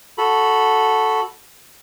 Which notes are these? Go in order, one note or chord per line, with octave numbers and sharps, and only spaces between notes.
F#4 A4 B5